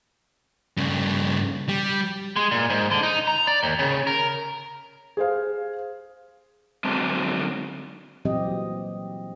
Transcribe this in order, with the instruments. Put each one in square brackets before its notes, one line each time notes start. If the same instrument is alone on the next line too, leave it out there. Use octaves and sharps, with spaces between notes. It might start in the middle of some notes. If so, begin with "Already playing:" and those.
[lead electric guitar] G2 C#3
G3
[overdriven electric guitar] G#3
A#2
G#2
D3
D#4
A#5
D5
D#2
C#3
A#4
[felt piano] G#4 C5 F5
[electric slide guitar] D3 F#3 G#3 C4 A5
[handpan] A#2 E3 F#3 C4 G4 D#5